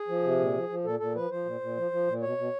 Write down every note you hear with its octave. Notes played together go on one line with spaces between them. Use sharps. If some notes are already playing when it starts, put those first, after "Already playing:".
Already playing: G#4
F3
C3
A#2
F3
F3
A#2 A4
A#2 A4
F3 B4
F3 C5
A#2
A#2
F3
F3
A#2
B2 C#5
B2